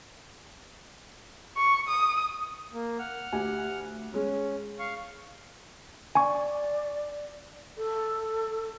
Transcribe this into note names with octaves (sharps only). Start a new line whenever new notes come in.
C#6
D#6
A#3
F#5 F6
D2 G4 G#5
G#3 C#4
F5 C#6
D5 G#5 C#6
A4